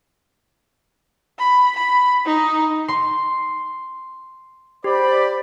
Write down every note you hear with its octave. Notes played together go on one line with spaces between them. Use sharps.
B5
B5
D#4
C6
G4 C5 D5 B5